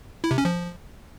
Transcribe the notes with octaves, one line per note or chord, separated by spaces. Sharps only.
E4
C3
C#4
F3